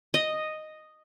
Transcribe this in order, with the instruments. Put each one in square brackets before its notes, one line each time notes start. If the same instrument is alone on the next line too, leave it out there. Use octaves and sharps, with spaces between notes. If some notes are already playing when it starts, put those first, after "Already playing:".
[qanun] D#5